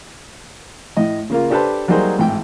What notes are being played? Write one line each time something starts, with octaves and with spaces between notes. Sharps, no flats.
A2 D#5
C#3 A#3 F4
D4 G4 A4 B4 C5 A5
F#3 G3 A#3 D#4 G#4 C5
G#1 A2 E3 G5